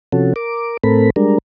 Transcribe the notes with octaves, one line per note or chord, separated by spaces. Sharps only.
C3 F3 C#4 F#4 A4
A#4 D6
A2 A3 C4 A4 A#4 B5
G3 G#3 D4 A#4